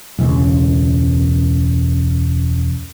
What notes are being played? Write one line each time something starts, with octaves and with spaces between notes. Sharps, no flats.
E1 C#2